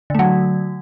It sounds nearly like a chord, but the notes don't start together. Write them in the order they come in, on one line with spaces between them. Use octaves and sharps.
D3 A3 F#3